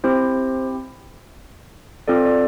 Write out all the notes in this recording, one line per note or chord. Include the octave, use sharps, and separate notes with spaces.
C4 E4 G4 C5
C4 F4 A4 D5
D5